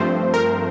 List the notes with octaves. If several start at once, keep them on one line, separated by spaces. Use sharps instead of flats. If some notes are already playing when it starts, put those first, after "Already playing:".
Already playing: G2 F3 A3 C4 C5
A#4